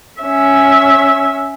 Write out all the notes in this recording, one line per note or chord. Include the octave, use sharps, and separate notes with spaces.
C#4 E5